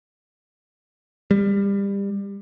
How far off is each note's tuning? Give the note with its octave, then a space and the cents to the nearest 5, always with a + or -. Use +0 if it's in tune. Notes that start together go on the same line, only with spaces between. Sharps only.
G3 +25